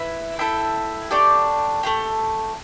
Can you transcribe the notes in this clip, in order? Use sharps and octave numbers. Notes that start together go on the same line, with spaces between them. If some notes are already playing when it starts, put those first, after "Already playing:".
Already playing: E4 B4 E5
E4 A4 E5 G5
A3 D4 G4 D5
A3 D4 G4